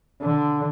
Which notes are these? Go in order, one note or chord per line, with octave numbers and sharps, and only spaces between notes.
D3